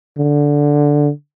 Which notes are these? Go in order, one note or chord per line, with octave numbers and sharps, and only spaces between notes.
D3